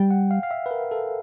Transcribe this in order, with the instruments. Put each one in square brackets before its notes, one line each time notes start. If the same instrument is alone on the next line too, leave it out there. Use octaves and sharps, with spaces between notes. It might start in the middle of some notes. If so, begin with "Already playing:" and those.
Already playing: [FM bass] G3 [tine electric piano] G5
[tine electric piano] F#5
F5
F5
E5
B4
A#4
A4